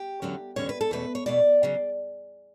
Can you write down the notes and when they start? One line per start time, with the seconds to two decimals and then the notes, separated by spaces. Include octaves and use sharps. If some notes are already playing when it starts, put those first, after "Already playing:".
Already playing: G4
0.22 E2 D3 F#3 C#4
0.56 E2 D3 F#3 C#4 C#5
0.69 B4
0.81 A4
0.91 E2 B2 A3 C#4 B4
1.15 C#5
1.26 E2 B2 A3 C#4 D5
1.63 C#3 F#3